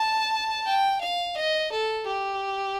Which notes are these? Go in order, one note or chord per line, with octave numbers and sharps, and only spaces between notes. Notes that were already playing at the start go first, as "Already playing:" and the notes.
Already playing: A5
G5
F5
D#5
A4
G4